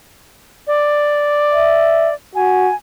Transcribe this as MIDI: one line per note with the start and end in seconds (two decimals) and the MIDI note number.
0.67 2.14 74
1.53 2.09 76
2.35 2.70 66
2.35 2.75 80